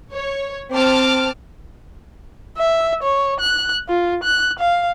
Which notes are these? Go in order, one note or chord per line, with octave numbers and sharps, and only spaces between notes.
C#5
C4 A5 D6 F6
E5
C#5
F#6
F4
F#6
F5